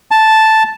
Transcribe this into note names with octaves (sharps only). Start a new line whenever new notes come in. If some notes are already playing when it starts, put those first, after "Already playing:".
A5